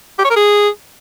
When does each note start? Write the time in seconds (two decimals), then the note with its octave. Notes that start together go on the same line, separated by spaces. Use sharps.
0.19 G4
0.24 C#5
0.30 A#4
0.36 G#4